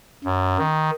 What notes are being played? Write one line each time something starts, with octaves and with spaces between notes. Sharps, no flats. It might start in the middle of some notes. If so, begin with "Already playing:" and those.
F#2
D#3